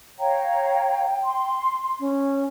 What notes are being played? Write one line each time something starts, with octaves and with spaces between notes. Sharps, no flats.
C#5 F5 G5 A#5
C6
C#4